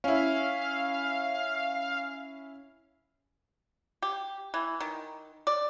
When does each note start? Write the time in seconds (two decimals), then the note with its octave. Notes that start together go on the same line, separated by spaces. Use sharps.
0.04 C#4 E4 F5
4.03 G4
4.54 E3
4.80 D#3
5.47 D5